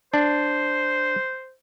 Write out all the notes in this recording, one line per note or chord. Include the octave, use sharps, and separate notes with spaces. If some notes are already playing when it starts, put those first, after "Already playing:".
D4 C5